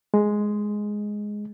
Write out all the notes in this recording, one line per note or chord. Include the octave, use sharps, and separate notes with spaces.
G#3